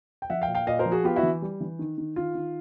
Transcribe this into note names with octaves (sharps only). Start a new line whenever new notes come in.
G5
F3 E5 F#5
F5 G5
A#2
F5 G5
A#2 D#5 F5
A#4 C5
F3
F#4 G#4
B3 F4 G4
E4 F#4
E3
G3
E3
D#3
D#3
D#3 F4
D#3